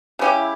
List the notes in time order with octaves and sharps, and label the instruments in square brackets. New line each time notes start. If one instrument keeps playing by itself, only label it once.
[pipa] C#3 G3 C#4 G4 [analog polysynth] E4